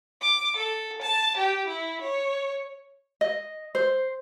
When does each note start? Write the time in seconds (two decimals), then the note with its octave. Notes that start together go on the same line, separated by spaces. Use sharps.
0.22 D6
0.56 A4
1.02 A5
1.37 G4
1.67 E4
2.01 C#5
3.21 D#5
3.75 C5